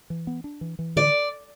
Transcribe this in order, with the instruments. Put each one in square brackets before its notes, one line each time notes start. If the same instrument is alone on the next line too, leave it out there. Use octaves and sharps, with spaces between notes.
[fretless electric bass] E3
B3
D4
E3
E3
[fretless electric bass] D3 [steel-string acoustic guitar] D5